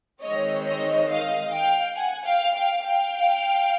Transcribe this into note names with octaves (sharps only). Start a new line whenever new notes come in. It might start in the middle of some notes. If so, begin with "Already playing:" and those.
D#3 G#3 C4 C#5 D#5
C#5 D#5
D#5 F5
F5 G5
F#5 G#5
F5 G5
F5 G5
F5 G5